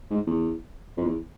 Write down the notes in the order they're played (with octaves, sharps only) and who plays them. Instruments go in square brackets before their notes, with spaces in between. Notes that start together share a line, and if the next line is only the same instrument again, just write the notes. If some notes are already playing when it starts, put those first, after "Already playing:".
[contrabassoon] G#2
E2
F2
E2